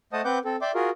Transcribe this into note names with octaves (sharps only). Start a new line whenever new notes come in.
A3 C5 D#5 F#5 A5 D#6
C4 B4 F#5 D6 G6
C4 A4
D5 E5 G5 C6 D6
F4 F#4 G#4 A#4